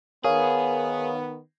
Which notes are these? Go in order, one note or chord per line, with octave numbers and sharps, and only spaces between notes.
D#3 B3 G#4 A#4 C#5 F5